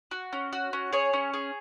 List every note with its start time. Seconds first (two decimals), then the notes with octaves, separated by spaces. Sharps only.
0.11 F#4
0.33 C#4
0.53 F#4
0.73 C#4
0.93 G#4 C#5
1.13 C#4
1.34 G#4